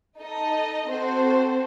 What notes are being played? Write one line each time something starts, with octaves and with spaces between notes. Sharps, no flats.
D#4 A4 D#5
C4 F#4 A4 C5